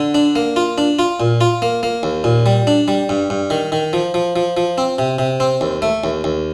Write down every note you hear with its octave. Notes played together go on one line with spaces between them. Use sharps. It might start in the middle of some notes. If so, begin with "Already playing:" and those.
Already playing: D3
D4
A#3
F4
D4
F4
A#2
F4
A#3
A#3
D#2
A#2
G3
D4
G3
G2
G2
D#3
D#3
F3
F3
F3
F3
C4
C3
C3
C4
D#2
A3
D#2
D#2